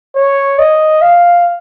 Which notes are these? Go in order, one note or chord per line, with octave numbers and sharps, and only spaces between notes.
C#5
D#5
F5